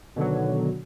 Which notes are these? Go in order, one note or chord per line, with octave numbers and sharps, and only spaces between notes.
B2 D3 D#3 F#3